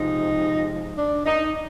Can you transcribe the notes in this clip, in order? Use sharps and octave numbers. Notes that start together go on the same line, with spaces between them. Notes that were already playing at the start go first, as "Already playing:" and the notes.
Already playing: C3 F3 G#3 D#4
D4
D#4